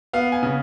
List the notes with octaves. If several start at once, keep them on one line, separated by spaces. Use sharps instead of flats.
B3 F5
G#5
C#3